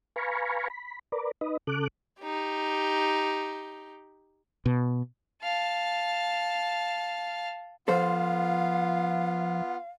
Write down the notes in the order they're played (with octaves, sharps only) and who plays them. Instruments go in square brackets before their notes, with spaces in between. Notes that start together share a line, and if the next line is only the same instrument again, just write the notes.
[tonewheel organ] B4 F5 G#5 A#5 B5 C#6
B5
A#4 B4 D5
D#4 B4 D#5
C#3 A4 D6 F#6
[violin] D#4 G4
[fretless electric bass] B2
[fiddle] F5 A5
[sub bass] F3 [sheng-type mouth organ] B3 F4 [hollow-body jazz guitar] A4 C5 [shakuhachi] F5